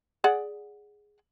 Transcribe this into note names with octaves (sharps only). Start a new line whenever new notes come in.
G#4 D5 F#5